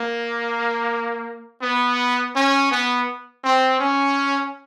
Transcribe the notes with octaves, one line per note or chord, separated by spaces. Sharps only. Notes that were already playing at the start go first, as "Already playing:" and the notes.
Already playing: A#3
B3
C#4
B3
C4
C#4